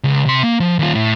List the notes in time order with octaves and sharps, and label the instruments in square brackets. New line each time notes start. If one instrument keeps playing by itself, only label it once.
[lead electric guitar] C#2
C3 C6
A#3
F3
D#2 F4
A2